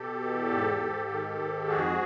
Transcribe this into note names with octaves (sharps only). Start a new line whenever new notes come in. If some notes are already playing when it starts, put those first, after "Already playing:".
Already playing: B2 G4 A4
E2
G#2
G#2
D#3
G#2
F2 F#4 G#4